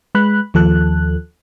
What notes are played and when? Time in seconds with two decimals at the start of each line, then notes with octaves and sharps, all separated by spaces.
0.15 G#3 B4 B5 F#6
0.54 D#2 F3 A4 F#6